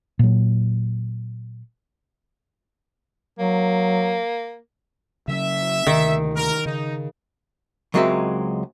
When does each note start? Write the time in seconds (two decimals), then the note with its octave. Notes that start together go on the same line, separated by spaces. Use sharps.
0.19 A#2 F#3
3.39 F#3 A#3
5.28 C#3 F#3 C#4 E5
5.87 D2 C3 D#3
6.36 A#4
6.66 C#3 D#4
7.94 C#2 F#3 G#3 C4 A#4 E5